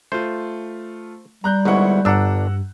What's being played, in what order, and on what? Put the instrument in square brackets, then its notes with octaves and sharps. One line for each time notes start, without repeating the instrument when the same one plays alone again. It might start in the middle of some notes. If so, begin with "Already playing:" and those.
[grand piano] A3 F4 [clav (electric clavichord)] C5
[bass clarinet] G3 [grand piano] A#5 F#6 G6
[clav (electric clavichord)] G1 G#2 [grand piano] G#3 E4 F#5 [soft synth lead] C#6
[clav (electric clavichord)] G1 D4 [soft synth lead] G2 [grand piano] F#5 A#5 E6